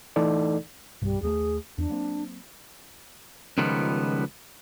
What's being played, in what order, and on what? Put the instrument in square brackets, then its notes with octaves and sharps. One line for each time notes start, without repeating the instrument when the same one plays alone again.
[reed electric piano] E3 A3 D#4 A4 D5
[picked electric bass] B1 G2 [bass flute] G3
[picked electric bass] D#2 G#3 A3 [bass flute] G#4
[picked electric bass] E2 [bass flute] D4
[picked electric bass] F#3 A#3 C4
[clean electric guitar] C#2 D#3 F3 G3 B3